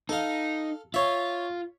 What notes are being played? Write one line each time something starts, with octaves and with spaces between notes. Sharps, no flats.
D#4 A4 F5
F4 C#5 E5